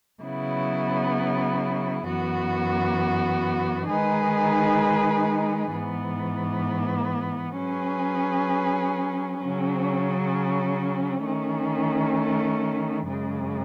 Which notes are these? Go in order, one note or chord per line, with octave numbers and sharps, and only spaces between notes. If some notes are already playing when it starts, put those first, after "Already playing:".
C#3 F#3 B3 E4
F#2 E3 B3 F#4
D#3 G#3 D#4 G#4 B4
G#2 E3 B3
F#3 C#4 G#4 B4
C#3 F#3 C#4
D#3 A3 C#4
F#2 C#3 G#3